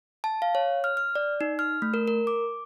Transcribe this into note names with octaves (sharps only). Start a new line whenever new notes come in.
A5
F5
C#5
F6
F6
D5
D#4
F6
A3
A#4
A#4
D6